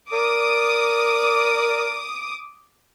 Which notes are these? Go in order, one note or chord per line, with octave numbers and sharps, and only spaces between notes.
A#4 D5 D6 D#6